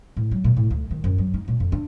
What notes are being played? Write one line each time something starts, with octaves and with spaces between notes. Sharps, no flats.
A2
F#3
A#2
A2
D2
D#3
F#2
F#3
D#4
A#2
F2
D4